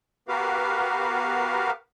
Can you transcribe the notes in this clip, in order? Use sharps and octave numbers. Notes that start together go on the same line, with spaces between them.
B3 F#4 G4 A#4 B4 F5